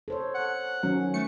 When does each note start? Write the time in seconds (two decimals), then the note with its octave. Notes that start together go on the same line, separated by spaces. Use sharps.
0.08 A4 C5 C#5
0.35 F#5
0.83 D#3 F#3 C#4
1.14 A3 C#7